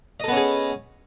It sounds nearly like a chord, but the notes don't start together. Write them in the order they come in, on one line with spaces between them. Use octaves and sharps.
D#5 A4 B3 C#4 G#4